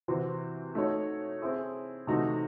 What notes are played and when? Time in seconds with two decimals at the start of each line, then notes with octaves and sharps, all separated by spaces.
0.08 C3 E3 C4 F#4 C5
0.75 A3 D#4 F#4 C#5
1.41 C4 E4 G#4
2.07 C3 E3 A3 D#4 F#4